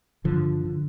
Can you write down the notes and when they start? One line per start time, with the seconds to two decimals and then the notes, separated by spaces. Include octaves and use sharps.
0.24 G2 D3 F3
0.65 D3